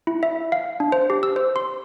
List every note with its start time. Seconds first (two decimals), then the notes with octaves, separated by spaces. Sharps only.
0.07 E4
0.23 E5
0.52 F5
0.80 D4
0.92 C5
1.10 G4
1.23 E6
1.36 C5
1.56 C6